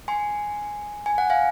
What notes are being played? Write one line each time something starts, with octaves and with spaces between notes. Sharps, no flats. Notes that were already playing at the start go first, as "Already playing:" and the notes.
G#5 C6
G#5
F#5
F5 G#5